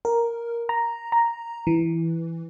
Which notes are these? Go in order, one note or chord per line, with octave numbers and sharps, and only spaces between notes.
A#4
A#5
A#5
E3